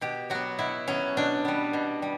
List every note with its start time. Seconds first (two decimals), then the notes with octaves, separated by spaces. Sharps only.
0.01 B2 G4
0.30 F#3 B3 F#4
0.59 B2 E4
0.88 F#3 B3 C#4
1.17 B2 D4
1.45 G3 B3
1.73 B2
2.02 G3